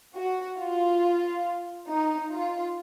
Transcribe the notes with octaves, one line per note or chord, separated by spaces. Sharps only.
F#4
F4
D#4
F4